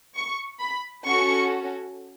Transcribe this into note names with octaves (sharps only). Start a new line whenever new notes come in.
C#6
B5
C#4 F#4 A4 C#6